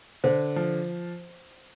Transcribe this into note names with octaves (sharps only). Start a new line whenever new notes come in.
D3 C5
F3